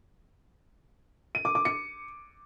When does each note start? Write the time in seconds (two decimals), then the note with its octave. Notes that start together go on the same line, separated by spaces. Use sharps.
1.35 D#7
1.45 D6
1.55 D6
1.65 C#7